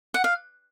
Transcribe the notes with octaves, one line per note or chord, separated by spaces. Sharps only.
F#5
F5